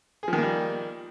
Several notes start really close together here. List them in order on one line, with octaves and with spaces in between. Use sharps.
G#4 F3 D#3 A#3 G3